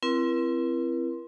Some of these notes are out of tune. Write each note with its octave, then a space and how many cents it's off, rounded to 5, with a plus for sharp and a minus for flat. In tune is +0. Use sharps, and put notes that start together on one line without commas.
C4 +0 E4 +35 A#4 +40